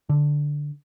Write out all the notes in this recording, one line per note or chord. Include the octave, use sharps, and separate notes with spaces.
D3